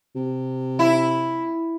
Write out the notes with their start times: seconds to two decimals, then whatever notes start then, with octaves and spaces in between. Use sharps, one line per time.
0.16 C3
0.79 E4